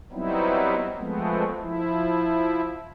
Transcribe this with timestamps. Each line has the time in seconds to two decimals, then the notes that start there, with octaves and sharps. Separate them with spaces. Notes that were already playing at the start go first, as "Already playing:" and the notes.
0.12 F#3 G3 B3 C4 D#4 E4
0.97 F3 G#3 A3 B3 C4
1.60 F3 E4